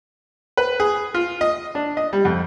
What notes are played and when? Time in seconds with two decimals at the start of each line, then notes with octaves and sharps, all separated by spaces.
0.57 B4
0.80 G#4
1.14 F4
1.41 D#5
1.75 D4
1.97 D#5
2.13 G3
2.25 F2